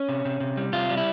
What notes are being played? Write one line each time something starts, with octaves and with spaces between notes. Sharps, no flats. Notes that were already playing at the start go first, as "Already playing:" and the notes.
Already playing: C#4
C3
C3
C3
G3
C3 F4
G3
E4